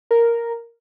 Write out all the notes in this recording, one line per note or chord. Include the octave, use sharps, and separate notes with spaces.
A#4